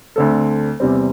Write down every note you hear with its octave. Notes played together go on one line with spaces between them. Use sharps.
D2 D3 C4 A4
E2 C3 G3 C4